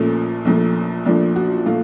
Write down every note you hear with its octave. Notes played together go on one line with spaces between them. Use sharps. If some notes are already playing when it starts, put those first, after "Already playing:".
Already playing: A#1 A#2 F3 A3 C#4
A#1 A#2 F3 A3
A#1 A#2 F3 A3 D4
F#4
A#2 F3 A3 F4